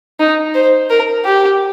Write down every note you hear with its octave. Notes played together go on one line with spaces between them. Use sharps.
D#4
C5
A#4
G4